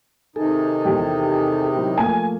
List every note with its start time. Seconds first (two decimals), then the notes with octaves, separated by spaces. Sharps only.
0.36 C3 D#3 D#4 G#4 A4
0.85 E2 G4
1.74 F#3 C4 E4
1.98 F3 A3 A#3 G#5